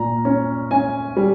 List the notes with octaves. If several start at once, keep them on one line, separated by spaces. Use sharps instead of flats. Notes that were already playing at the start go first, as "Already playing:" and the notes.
Already playing: A#2 A#5
C#4
C#4 G#5
G3